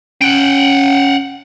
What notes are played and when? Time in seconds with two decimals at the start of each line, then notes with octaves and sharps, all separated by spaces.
0.21 C#4 F#5 G5